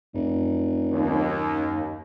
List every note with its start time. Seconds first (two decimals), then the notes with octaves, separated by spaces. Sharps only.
0.14 F1 F#2
0.92 D#2